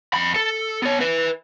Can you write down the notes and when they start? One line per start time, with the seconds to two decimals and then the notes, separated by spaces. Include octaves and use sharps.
0.14 F2 B5
0.36 A4
0.82 B3 C#5
1.01 B4 E5